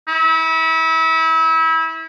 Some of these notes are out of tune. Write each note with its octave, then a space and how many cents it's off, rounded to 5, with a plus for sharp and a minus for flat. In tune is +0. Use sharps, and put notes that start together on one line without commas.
E4 -30